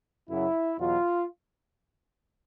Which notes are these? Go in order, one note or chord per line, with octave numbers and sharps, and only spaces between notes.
F#2 C#3 F#3 E4
E2 B2 F#3 F4